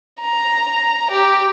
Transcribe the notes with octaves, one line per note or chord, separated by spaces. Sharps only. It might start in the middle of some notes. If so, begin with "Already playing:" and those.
A#5
G4